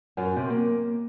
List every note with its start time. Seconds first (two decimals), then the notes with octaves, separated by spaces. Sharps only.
0.17 F#2
0.36 C3
0.50 A#3